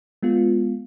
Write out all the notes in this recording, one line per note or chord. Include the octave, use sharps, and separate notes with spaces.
G#3 B3 F4